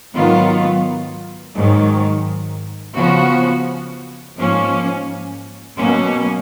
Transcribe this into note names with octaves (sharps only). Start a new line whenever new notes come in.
G#2 D#3 F#3 B3 F4
G#2 D#3 F#3
C#3 F3 B3 F#4
G#2 F3 A#3 C#4
B2 F#3 A#3 C#4